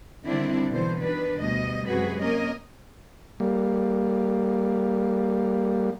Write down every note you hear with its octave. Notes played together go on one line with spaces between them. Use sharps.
D3 D#3 G3 C4 D4 E4
B2 D3 E3 C5
D#3 D4 B4
D2 B2 G3 D#5
F#2 C3 G#3 F#4 G#4 B4
A#3 C#4 A#4 D#5
G3 A#3